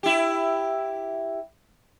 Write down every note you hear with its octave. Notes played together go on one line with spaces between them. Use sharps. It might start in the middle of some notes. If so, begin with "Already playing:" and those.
E4 G4